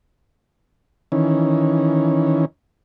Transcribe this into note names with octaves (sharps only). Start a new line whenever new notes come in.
D#3 E3 C#4